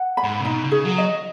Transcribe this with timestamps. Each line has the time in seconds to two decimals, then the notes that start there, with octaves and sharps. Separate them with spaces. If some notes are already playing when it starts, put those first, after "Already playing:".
Already playing: F#5
0.17 B5
0.24 G#2
0.40 C#3
0.44 B2 D#4
0.64 C#3
0.71 G#4
0.85 F#3
0.98 D#5